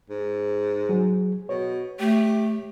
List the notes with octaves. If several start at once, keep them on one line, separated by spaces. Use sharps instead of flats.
G#2
F#3 G#4
B2 C#5
A3 G4